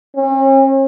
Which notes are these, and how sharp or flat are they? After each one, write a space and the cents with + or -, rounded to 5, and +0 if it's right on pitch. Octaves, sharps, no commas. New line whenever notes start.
C#4 -45